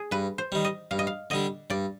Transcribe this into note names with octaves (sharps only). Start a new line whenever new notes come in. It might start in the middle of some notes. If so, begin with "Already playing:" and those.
Already playing: G#4
G2 B4
C5
D#3 G3
D#5
G2 F5
D#5
F5
D3 G3 D4 D#5
G2 D5